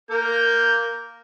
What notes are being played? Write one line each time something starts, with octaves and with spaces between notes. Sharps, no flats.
A#3 A#4 G6